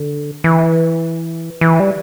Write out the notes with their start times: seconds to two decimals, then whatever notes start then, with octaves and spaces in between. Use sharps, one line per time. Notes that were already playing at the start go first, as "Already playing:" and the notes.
Already playing: D3
0.44 E3
1.61 E3
1.80 G3